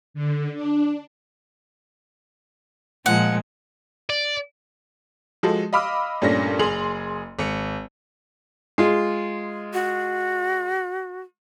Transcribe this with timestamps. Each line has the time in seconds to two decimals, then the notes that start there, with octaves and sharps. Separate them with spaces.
0.14 D3
0.54 D4
3.06 A#2 F3 G#3 F#5
4.10 D5
5.43 F3 G#3 F#4 A4
5.73 D#5 F5 B5 D6 E6 F6
6.22 G2 A#2 A3 C#4 D4 A#6
6.59 F#1 G#4 C6 F7 F#7
7.39 G#1 C#7
8.78 G#3 F4
9.73 F#4